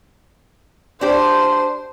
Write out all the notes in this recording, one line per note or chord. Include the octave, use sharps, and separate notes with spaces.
D4 G4 C5 C6